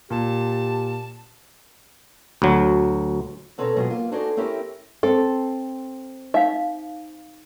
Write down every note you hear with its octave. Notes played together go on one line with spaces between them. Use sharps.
A#2 G4 A5
D2 F#3
B2 C4 C#4 A4 B4 A#5
G#2 B2 F3 F#3 G#4
A#3 F4
D#4 F#4 G#4 A4 C5 D5
C4 C#4 E4 G4 A#4
C4 A4
D#4 E5 F5